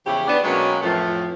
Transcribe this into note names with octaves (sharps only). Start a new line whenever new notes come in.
E2 C#3 F3 E4 G4
B3 D4
B2 F#3 G#3 A#3 C4 C#4
F2 A2 E3 F3